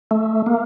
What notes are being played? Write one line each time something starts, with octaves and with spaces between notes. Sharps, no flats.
A3
A#3